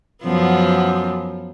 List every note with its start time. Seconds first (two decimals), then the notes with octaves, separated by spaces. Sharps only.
0.23 F#2 F3 B3